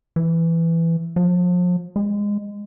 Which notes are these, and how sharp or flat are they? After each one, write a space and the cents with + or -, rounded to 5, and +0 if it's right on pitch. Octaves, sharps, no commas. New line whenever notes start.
E3 +10
F3 +35
G#3 -20